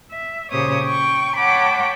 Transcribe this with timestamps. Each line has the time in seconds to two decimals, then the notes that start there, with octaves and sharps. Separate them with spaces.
0.12 E5
0.51 A#2 C#3 G4 C5 C#5 D#6
0.85 G5 C#6
1.37 C#5 F#5 G5 A5 B5 D6